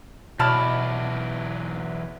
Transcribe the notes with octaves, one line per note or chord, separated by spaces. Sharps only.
E2 B2 F#3 E4 D5 A5 F6 A6